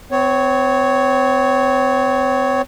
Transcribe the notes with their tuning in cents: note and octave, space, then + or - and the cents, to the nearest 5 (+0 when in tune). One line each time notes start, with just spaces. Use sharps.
C4 -35 C#5 +0